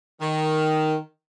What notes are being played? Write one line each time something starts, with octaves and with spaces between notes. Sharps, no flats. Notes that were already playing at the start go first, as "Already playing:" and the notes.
D#3